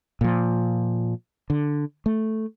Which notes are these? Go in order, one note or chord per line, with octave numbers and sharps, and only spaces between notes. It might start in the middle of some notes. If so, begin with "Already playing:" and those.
A#2 F3
D3
A3